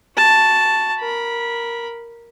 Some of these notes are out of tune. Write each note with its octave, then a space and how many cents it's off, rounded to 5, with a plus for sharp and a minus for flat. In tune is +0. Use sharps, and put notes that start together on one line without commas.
F#4 +0 A5 +0
A#4 +0 B5 -15